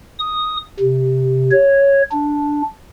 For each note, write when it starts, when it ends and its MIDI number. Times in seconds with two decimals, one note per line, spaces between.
0.19 0.57 87
0.80 1.51 48
1.51 2.02 73
2.12 2.62 62